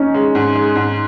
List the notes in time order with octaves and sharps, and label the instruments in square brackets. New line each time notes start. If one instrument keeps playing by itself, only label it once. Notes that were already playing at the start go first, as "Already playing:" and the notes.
Already playing: [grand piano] C#4 D#4
[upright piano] G#3
G#2
G#3
G#2